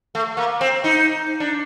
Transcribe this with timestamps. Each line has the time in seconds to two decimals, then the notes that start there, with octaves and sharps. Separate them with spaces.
0.15 A3
0.37 A#3
0.61 C4
0.84 D#4
1.40 D4